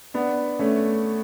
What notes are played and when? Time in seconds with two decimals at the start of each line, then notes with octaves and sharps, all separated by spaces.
0.14 B3 D4
0.59 A3 C#4